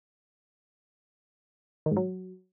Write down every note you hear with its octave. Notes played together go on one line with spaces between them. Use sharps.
D#3
G#2
F#3